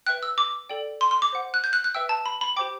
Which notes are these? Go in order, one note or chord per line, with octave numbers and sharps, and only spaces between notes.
B4 E5 G5 F#6
E6
D6
A4 D5 G5
C6
C6
D6
C5 F#5
F#6
G6
F#6
F#6
B4 E5 G5 E6
A5
B5
B5
G4 C5 G5 D6